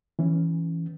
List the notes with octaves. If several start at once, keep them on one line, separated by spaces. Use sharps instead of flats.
E3 C#4